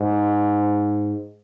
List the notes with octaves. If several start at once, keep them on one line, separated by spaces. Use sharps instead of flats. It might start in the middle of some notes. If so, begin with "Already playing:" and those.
Already playing: G#2